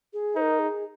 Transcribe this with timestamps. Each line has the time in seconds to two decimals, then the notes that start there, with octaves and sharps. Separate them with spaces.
0.13 G#4
0.36 D#4 C5
0.41 A#4
0.59 G#4